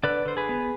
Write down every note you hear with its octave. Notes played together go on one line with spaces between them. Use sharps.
D3 B4 D5
D3 C5
G#4 B4
B3